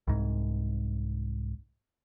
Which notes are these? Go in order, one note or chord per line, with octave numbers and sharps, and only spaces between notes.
C2 G#2